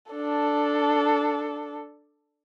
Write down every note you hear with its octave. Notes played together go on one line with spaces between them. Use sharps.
D4 A4